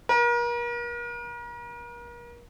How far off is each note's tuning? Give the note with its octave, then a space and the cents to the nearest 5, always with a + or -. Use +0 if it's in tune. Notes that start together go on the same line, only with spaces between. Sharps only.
A#4 +40